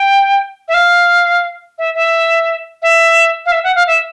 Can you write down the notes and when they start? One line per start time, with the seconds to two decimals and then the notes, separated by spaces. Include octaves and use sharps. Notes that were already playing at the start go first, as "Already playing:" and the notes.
Already playing: G5
0.68 E5
0.74 F5
1.78 E5
1.95 E5
2.82 E5
3.46 F5
3.52 E5
3.64 F#5
3.75 F5
3.87 E5